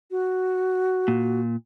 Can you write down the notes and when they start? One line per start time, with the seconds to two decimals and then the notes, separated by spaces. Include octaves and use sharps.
0.11 F#4
1.08 A#2